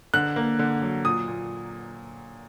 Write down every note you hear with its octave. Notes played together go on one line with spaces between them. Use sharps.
D3 F#6
A#3
D3
F#3
A#2 D#6
A#2